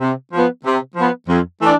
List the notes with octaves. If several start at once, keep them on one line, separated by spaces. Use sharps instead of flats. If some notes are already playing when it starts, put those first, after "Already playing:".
C3
F3 B3
C3
F3 B3
F2
E3 A3 D4